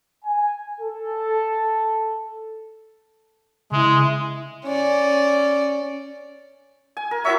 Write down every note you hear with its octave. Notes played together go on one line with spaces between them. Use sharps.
G#5
A4
C#3 G#3 E4
C#4 D5
G#5
A#4
E4 F#4 C#5 E5